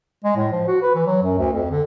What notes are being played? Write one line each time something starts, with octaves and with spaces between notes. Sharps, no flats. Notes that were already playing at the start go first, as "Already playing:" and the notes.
G#3
A2
F3
F#4
B4
E3
F#3
F#2
D2
F2
D3